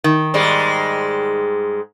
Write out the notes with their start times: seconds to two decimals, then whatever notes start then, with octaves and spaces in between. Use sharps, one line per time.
0.04 D#3
0.34 G#2 G3 G#3